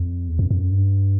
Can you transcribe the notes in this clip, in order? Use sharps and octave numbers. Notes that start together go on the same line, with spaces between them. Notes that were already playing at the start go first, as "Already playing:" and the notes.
Already playing: F2
E2
F2
F2
F#2
G2